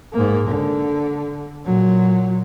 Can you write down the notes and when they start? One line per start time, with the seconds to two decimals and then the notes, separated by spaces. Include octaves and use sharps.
0.13 G#2 A#3
0.47 D3
1.66 A#2 F#3